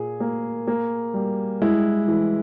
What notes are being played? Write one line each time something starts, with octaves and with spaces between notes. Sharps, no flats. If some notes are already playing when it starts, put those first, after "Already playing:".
Already playing: A#2 G#4
A#3
A#3
G3
G#3 E4
E3